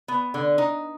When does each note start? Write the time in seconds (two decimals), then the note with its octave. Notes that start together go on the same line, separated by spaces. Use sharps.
0.08 B3
0.34 D3
0.58 D#4